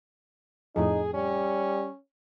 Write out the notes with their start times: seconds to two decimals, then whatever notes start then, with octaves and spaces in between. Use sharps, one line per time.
0.76 F2 A2 D#4 G#4
1.14 G3 C#4